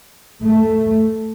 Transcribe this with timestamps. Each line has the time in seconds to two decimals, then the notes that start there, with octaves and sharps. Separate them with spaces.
0.43 A3